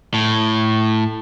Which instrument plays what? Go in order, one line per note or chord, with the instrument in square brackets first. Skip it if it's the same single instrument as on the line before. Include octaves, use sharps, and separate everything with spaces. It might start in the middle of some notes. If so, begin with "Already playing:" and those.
[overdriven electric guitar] A2